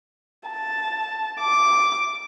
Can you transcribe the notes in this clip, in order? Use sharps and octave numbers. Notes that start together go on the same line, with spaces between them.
A5
D6